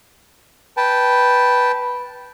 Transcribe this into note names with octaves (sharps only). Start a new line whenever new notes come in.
B4 G5 A5